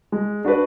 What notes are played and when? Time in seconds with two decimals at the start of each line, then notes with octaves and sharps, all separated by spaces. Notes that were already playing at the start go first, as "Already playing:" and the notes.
0.12 G#3
0.44 D4 F#4 B4 D5